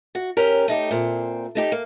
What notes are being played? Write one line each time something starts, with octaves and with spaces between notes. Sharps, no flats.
F#4
C#4 G4 A#4
A3 D#4 G4
A#2 C4
A3 D#4 G4
A#3